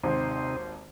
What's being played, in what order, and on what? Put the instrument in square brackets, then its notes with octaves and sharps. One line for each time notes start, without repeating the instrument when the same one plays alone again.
[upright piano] G#1 D#2 [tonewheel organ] C3 C4 D#4 [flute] C5